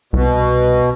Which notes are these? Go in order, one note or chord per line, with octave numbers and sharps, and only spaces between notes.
C2 B2